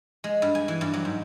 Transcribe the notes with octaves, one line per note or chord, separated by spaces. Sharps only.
G#3
G2
G#5
E3
G2
F#3
G#2